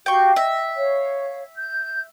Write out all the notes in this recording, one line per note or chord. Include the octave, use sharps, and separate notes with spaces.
F#4 G4 F5 G5 C#6
D#5 E5
C#5 F5
G6